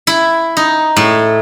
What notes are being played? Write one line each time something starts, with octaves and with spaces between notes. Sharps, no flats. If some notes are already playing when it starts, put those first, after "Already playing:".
E4
D#4
A2